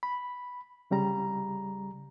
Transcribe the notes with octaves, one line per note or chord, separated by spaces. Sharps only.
B5
C2 C#3 G3 A#5